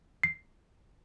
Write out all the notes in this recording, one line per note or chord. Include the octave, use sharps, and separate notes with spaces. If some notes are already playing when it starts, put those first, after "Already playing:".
C7